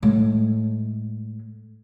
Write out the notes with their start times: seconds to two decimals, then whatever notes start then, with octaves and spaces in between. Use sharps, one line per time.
0.03 A2 G#3